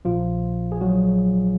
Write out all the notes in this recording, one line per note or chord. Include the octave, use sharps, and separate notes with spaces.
A#1 A#2 F3 F4
G#4
F#3 F#4